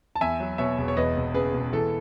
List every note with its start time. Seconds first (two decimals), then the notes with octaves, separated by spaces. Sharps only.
0.15 A5
0.21 E2 E5 G#5
0.40 F#3
0.58 B2 C#5 E5
0.78 E1
0.88 C#5
0.97 E2 B4 D#5
1.16 E1
1.34 C#3 G#4 B4
1.54 E1
1.73 E3 A4